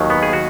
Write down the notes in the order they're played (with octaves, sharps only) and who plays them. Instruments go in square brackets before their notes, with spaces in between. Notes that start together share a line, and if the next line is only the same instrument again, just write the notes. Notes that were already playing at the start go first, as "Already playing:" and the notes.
Already playing: [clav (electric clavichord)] D#2 D#3 F#3
B3
G#4
F#4